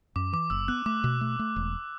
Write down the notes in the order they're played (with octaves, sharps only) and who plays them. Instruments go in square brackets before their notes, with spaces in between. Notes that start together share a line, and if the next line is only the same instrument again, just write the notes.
[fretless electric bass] F#2 [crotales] D6
[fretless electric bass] E3 [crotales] D6
[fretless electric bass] F#1 [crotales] E6
[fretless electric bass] B3 [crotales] F#6
[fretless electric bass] A3 [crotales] D6
[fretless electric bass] B2
A3
A3
E1